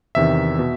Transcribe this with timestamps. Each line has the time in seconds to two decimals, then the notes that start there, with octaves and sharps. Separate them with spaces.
0.15 E2 C3 D#3 E5
0.59 B2